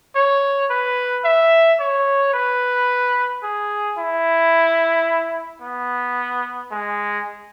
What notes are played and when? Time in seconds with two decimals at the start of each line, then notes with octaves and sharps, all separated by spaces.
0.16 C#5
0.70 B4
1.25 E5
1.80 C#5
2.34 B4
3.43 G#4
3.98 E4
5.62 B3
6.71 G#3